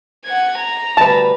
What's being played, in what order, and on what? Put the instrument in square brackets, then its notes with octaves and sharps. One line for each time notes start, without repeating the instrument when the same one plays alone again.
[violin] F#5 G#6
A#5
[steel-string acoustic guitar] D2 G3 B4 [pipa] A5